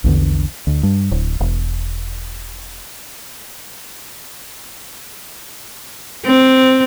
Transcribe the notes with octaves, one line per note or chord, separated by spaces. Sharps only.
A#1 E2 D3
D2
G2
D1
E1
C4